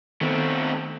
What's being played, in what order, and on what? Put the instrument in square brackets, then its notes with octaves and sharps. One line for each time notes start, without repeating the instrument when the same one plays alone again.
[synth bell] D#3 B3 A4 [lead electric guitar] A3 C4